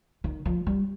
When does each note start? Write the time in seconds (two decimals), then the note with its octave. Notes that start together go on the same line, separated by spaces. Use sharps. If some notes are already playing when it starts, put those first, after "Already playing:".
0.24 D#3
0.45 F3
0.66 G3